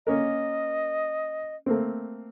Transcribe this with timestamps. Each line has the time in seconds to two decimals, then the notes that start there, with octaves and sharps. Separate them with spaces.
0.07 A#3 C#4 A#4 D#5
1.66 A3 A#3 C4